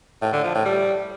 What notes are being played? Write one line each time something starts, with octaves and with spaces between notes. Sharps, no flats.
A2
D3
F3
A2
G3